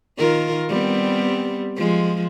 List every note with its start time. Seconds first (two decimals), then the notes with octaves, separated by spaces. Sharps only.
0.17 D#3 F4 A#4
0.68 G3 B3 C4
1.76 F3 G#3